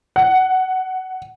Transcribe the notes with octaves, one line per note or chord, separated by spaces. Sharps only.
F#5